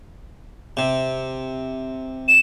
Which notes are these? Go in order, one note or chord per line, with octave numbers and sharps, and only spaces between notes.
C3
E7